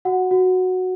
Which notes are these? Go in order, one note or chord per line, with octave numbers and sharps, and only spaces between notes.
F#4 F#5
F#4